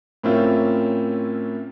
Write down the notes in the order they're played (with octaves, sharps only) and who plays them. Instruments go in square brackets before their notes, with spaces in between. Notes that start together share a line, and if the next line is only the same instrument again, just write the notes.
[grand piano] A2 A#3 C4 C#4 E4 F4